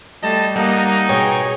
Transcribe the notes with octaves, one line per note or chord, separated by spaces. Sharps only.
G3 A3 D#5 A5
G3 A#3 D#4 D#5 F#5
B2 G#4 C#5 G5